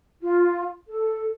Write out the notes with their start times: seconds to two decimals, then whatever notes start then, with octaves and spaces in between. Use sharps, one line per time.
0.21 F4
0.87 A4